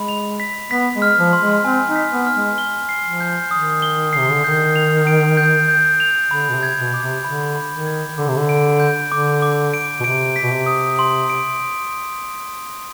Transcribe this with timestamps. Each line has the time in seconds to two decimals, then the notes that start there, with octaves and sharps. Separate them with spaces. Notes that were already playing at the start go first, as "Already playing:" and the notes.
Already playing: G#3 B5
0.09 F7
0.40 B6
0.71 B3 B6
0.94 G#3
1.02 F6
1.17 F3
1.33 C6
1.41 G#3
1.64 C4 G#5
1.87 D#4
1.96 B6
2.12 B3
2.27 F6
2.35 G#3
2.58 G7
2.89 C7
3.04 F3
3.20 G6
3.51 D#3 D#6
3.82 G7
4.13 C3 C7
4.31 D3
4.44 D#3 G6
4.76 F7
5.07 D7
5.37 G6
5.68 G6
6.00 F7
6.31 D3 B5
6.49 B2
6.55 C3
6.63 G#6
6.78 B2
6.94 D6
7.01 C3
7.24 D3 B5
7.56 B5
7.71 D#3
7.86 G#6
8.18 D3 D6
8.28 C3
8.37 D3
8.49 D7
8.80 G6
9.11 D3 D6
9.42 D6
9.74 D7
10.00 B2
10.04 C3 D7
10.36 B6
10.43 B2
10.51 C3
10.66 D#6
10.99 C6
11.30 D7